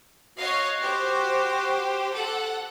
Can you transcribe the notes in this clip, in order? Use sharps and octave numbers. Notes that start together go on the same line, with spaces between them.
F#4 C#5 D#5 F5
G4 C5
A4 F#5